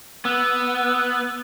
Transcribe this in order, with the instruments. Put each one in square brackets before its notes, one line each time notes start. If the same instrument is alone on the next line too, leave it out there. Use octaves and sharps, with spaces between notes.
[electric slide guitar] B3 [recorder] E6